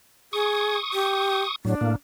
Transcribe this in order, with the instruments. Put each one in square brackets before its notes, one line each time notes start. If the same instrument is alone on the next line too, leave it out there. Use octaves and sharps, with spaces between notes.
[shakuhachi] G#4 [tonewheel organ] C#6 D#6
[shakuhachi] G4
[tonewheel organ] A2 F#3 [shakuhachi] D4
[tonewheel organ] A2 A#3